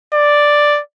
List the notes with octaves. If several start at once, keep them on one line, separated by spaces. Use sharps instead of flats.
D5